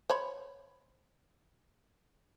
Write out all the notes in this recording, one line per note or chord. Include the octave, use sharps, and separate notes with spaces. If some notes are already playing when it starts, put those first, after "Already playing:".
C5 C#5 B5